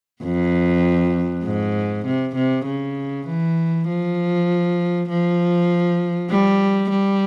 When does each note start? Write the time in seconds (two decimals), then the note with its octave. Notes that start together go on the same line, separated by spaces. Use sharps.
0.23 F2
1.44 G#2
2.06 C3
2.35 C3
2.66 C#3
3.26 E3
3.88 F3
5.09 F3
6.30 G3
6.90 G3